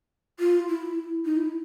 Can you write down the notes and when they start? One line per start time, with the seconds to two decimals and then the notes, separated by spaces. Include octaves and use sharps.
0.40 F4
0.69 E4
1.25 D#4
1.37 E4